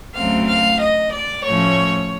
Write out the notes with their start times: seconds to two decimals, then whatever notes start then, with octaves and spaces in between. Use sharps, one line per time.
0.15 D2 C#3 F#3 A3 C4 F5
0.48 F5
0.80 D#5
1.13 D5
1.44 A2 F3 A3 C#4 C#5